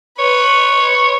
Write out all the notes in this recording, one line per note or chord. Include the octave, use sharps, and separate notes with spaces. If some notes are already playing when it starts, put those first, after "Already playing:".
B4 C#5